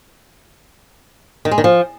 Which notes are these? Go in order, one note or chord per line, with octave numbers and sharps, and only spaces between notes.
D#3
G#3
D#3
F3